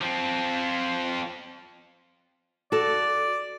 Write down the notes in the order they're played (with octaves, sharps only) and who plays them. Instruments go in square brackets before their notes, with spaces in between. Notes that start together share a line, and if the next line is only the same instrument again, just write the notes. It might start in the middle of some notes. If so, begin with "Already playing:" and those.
[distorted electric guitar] F3 C4
[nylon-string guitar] F#4 A4 [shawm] D5